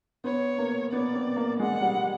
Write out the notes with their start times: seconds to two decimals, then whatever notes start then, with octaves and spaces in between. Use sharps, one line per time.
0.24 B3 C#5
0.59 A#3
0.92 B3 D5
1.15 C4
1.36 A#3
1.60 G#3 F#5
1.82 G3